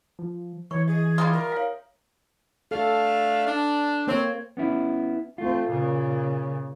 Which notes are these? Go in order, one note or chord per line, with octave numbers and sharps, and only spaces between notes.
F3
E3 C#5 C#6
G#4 D#5
G3 G#3 F4 E5 A#5 D#6
A#4
C#5 F5
A3 D4 A4 F5
D4
A#3 C4 C5 C#5
B3 C#4 E4
A3 C4 F4
A#2 C#3